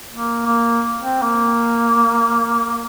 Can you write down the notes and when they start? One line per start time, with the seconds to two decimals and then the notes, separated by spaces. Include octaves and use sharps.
0.12 A#3
0.46 A#3
1.01 C4
1.22 A#3